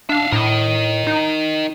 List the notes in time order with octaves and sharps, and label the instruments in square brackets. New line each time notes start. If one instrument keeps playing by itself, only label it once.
[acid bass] D4 [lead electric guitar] E5 F5
[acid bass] A2 [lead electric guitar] A#4 D#5
[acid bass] D#4